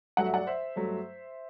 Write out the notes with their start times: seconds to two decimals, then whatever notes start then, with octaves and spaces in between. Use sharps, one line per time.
0.17 G2 F#3 A3 F#5
0.25 E5
0.34 D5 F#5
0.47 C5 E5
0.76 G2 F#3 A3